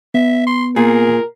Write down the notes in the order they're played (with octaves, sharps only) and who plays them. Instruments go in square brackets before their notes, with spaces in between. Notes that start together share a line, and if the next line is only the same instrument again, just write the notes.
[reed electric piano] B3 [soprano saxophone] E5
[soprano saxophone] C6
[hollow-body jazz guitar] A#2 [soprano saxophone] G#4 [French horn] A#4